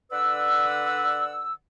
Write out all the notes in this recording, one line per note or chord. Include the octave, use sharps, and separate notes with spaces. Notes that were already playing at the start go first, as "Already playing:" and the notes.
D3 B4 D5 F#5 E6